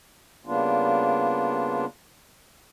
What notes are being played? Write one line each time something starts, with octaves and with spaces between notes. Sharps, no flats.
C#3 G3 A#3 B3 D4 F4